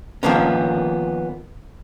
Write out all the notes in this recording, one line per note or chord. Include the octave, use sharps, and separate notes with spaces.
D#3 F3 A#3 B3 C#4